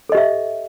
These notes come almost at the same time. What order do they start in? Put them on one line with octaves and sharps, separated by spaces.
A4 D#5 G4 E5